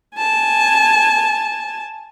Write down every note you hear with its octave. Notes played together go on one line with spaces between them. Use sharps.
G#5 A5